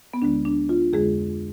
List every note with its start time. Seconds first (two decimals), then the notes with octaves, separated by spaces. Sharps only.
0.14 B3
0.22 D2 D3 G#3 D4
0.45 D4
0.69 F4
0.93 F2 D3 G#3 G#4